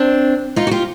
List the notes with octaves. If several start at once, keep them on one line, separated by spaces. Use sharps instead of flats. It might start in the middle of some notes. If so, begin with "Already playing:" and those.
Already playing: C4 D4
D#4 F4
F#4
F4 G4